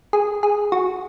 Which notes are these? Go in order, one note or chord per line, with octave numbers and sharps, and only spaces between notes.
G#4
G#4
F#4